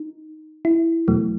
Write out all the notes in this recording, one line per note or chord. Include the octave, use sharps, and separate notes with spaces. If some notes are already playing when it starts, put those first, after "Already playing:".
Already playing: D#4
E4
E2 B2 F#3 A3